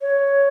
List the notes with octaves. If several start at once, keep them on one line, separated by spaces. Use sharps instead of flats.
C#5